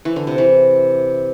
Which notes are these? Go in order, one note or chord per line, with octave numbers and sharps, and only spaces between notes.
E3
D3
C3
E3